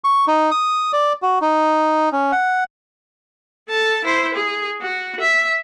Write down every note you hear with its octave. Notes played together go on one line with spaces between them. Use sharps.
C#6
D#4
D#6
D5
F#4
D#4
C#4
F#5
A4 A5
E4 C5
G#4
F#4
E5